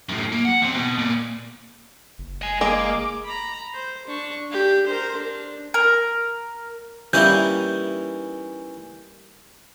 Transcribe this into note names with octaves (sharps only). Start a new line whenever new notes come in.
F#2 A2
A#3
F#5
E2 C4
B2
A#2
F#1
D#5 G#5
G#3 A#3 D6
A#5 B5
C5
D4 C#6
D4 G4
A#4 C5
D4
A#4
E3 G3 A#3 C#4 D#4 E4 G6